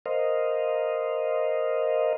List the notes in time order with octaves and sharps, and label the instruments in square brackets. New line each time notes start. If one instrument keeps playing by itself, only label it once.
[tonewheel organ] A#4 C5 D#5 F5